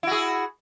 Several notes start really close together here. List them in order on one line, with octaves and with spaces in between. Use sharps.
E4 F#4 G#4